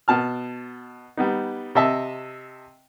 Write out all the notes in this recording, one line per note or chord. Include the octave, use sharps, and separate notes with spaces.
B2 A5 F6
G3 B3 D#4
C3 D#5 E5 A5